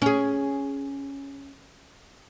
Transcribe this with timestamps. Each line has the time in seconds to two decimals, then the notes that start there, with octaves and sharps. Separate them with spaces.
0.02 C#4 G#4